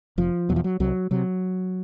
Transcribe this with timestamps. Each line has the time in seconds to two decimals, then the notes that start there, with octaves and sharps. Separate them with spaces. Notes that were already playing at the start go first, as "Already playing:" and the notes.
0.18 F1 F3
0.49 E2 B2 F#3
0.56 F3
0.64 F#3
0.80 C2 F#3
1.11 C3 F#3